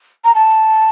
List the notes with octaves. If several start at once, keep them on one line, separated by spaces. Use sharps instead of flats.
A#5
A5